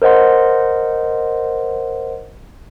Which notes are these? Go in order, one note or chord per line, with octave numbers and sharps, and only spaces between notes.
A#4 C5 D#5 F#5 C6